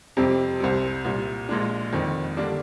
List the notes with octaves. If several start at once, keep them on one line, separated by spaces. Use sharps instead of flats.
F2 C3 G3 C4 G4
C2 C3 G3
C2 A#2 G3
A#1 A#2 G#3 D4
F1 F2 D#3
D3 G3 A#3 D4